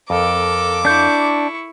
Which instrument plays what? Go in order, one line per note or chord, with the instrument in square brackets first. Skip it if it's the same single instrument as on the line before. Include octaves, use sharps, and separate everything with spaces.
[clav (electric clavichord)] F2 [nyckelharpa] A4 A#4 [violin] D6
[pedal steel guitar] D4 G6 [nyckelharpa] E4 C#6